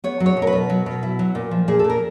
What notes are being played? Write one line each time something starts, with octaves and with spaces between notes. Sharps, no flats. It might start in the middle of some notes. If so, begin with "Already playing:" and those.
B3 C#5
F#3
C#5
B2
A#4
B4
B2
F#3
B2
E4
F#3
A#2
F3
A#2 G#4
A4
A#2
A#4